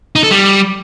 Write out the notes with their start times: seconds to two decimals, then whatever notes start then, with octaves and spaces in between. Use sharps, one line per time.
0.16 D#4
0.23 A4
0.31 G3